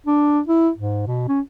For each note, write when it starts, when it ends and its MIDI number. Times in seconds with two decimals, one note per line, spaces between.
0.06 0.40 62
0.48 0.70 64
0.78 1.02 44
1.07 1.27 47
1.28 1.40 61